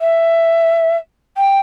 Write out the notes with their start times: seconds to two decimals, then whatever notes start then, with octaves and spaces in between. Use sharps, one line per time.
0.01 E5
1.37 G5